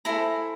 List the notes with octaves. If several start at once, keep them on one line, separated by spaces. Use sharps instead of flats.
E4 A4 C5 G#5 A#5